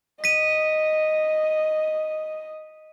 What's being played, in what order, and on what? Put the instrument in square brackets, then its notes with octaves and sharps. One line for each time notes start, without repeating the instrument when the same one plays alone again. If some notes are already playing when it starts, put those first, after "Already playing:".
[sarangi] D#5 [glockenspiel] B6 D#7